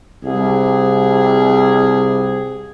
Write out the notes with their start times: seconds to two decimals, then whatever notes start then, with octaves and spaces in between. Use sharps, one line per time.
0.25 C2 G#4